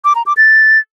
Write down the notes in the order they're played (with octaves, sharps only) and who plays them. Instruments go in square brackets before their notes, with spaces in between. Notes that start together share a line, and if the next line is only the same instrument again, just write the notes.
[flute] D6
A#5
D6
A6